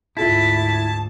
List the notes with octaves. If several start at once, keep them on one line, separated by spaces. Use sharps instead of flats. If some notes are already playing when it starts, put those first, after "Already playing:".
D2 G#2 E4 F4 A4 E5 A5